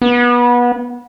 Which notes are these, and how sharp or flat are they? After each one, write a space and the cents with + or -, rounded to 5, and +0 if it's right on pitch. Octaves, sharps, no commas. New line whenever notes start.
B3 -25